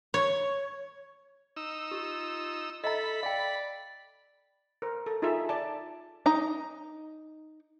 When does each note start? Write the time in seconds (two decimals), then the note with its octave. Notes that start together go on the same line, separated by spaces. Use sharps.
0.14 C#5
1.57 D#4 E6
1.91 F4 G4
2.84 A4 D#5 E5 A#5 B5
3.23 D5 F5 G5
4.82 A#4 C5
5.06 A4
5.22 D#4 F4 G#4 A4 E5
5.49 D5 A5
6.26 D#4 A#5